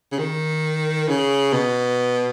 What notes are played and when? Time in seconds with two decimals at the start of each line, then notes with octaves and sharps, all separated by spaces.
0.12 C#3
0.19 D#3
1.08 C#3
1.53 B2